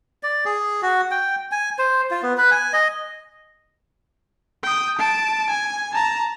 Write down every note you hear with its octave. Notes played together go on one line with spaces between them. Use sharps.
D5
G#4
F#4
G5
G#5
C5
F4
B3
B4
G#5
D#5
G5 D#6
A5 D7
G#5
A5 A#5